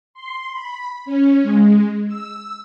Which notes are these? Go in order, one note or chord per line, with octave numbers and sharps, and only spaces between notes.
C6
B5
C#4
G#3
E6